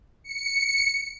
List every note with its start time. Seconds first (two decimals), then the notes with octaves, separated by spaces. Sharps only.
0.23 C#7